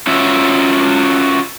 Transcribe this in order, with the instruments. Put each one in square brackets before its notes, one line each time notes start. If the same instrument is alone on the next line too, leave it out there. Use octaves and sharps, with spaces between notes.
[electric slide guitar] C#4 F4 F#4 E5